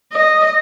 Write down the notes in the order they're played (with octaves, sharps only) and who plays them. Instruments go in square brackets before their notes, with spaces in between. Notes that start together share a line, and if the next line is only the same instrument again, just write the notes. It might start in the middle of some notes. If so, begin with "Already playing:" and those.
[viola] D#5